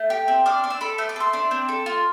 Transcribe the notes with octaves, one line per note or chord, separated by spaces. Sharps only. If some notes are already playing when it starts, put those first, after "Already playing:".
Already playing: A3
G4
C4
D4 D6 F6
D4
E6
A4 B5 D6
A3 E6
D6
A4
C6 E6
D4
C4
A4
F4